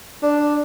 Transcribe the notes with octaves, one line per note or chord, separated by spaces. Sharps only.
D4